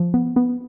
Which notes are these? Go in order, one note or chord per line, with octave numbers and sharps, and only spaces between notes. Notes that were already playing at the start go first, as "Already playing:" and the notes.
Already playing: F3
B3
B3